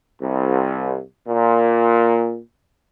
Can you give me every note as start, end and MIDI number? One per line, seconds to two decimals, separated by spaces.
0.21 0.99 36
1.27 2.38 46